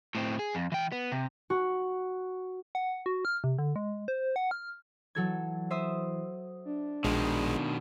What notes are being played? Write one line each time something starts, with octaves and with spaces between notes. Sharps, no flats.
A2 C4
G#4
F2
E3 G5
B3
C3
F#4
F#5
F#4
F6
C3
D3
G#3
C5
F#5
F6
E3 F#3 A4 G#6
C5 E5 D#6
D4
A#1 B2 D#3 G#3